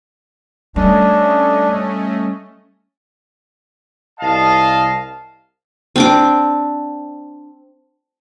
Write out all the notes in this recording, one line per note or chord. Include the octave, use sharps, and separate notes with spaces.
G3 A3 C#4 D4 D#5
C2 D#5 F5 A5
C4 D4 D6